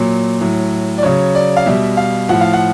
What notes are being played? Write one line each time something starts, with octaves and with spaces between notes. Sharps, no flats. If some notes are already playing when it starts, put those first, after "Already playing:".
Already playing: A#2 F#3
A2 F#3
D5
C#3 F#3 C#5
D5
F5
B2 G3 E5
F5
A2 F3 F#5
F5
F#5